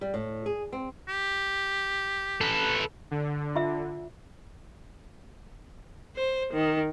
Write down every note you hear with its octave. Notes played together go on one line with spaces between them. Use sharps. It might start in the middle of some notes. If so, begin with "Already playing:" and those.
G3
A2
G#4
C4
G4
A4 B4
D3
F4 E5
C5
D#3